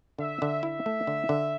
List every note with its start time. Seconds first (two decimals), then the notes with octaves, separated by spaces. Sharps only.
0.19 D3 E5
0.42 D3
0.63 E4 E5
0.86 A3
1.07 D3
1.29 D3